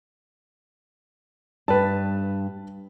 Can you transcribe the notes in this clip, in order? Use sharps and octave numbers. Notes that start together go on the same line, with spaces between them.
G2 B4 A5